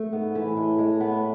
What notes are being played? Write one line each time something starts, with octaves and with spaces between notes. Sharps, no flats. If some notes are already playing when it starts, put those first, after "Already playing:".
Already playing: A3
G#2 B3
E3
A2
G#3
G#3
B3